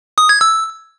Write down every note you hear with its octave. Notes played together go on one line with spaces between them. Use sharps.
D#6
G#6
E6